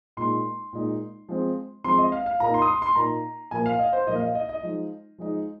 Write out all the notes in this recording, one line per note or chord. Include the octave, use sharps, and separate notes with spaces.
A#2 G#3 D#4 C6
A#2 G#3 D#4
F3 G#3 C4
F3 G#3 C4 C6
D#5
F5
F5
A#2 A#3 D#4 A#5
C6
D#6
C6
C6
A#2 A#3 D#4 A#5
A#2 F3 A#3 G#5
F5
D#5
C5
A#2 F3 A#3 D#5
F5
D#5
D#5
D#5
F3 G#3 D#4
F3 G#3 D#4